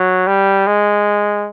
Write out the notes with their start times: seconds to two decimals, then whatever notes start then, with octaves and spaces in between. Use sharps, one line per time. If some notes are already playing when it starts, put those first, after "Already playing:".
Already playing: F#3
0.27 G3
0.67 G#3